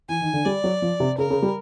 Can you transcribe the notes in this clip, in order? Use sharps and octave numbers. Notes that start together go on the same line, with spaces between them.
E3 G#5
D#3
D3
G3 D5
F#3
F3
C3
C#3 A#4
C#3
G3